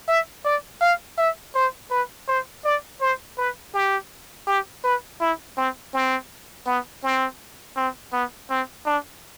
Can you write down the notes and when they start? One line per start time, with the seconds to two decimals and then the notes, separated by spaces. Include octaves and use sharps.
0.08 E5
0.45 D5
0.81 F5
1.18 E5
1.55 C5
1.91 B4
2.28 C5
2.65 D5
3.01 C5
3.38 B4
3.74 G4
4.47 G4
4.84 B4
5.20 E4
5.57 C4
5.94 C4
6.67 B3
7.04 C4
7.77 C4
8.13 B3
8.50 C4
8.86 D4